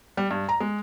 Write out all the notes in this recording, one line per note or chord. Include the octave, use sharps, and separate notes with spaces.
G3
G2
A#5
G#3